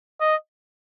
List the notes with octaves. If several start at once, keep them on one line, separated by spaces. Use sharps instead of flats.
D#5